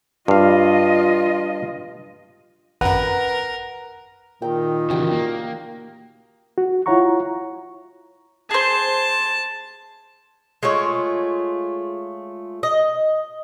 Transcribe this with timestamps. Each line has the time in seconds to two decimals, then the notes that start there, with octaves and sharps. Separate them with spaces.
0.28 G2 F4 D#5 F5
2.81 G#1 F#2 A#4 B4 F#5 A#5
4.42 A#2 D#3 G5 A#5
4.90 C#3 E3 F#4 G4 G5
5.11 A#3
6.58 F#4
6.86 E4 F4 C#5 F#5 A#5 C#6
8.51 G#4 C5 A5
10.63 G#3 A3 F4 C#5
12.63 D#5